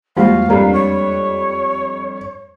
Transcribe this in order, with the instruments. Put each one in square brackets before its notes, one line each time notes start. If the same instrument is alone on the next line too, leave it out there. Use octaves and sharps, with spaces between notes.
[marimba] E2 G#3 A#3 [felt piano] F3 G3 F#4 [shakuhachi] F5
[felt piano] F2 G3 D4 [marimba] A#4 A#5
[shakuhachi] C#5